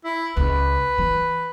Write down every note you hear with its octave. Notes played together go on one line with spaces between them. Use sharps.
E4
C#2 B4
E3